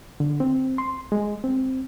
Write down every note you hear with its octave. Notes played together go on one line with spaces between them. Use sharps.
D3
C4
C6
G#3
C4